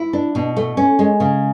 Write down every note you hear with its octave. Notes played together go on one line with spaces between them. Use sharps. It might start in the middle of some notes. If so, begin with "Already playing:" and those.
Already playing: E4
D4
B2
A3
C#4
G#3
C#3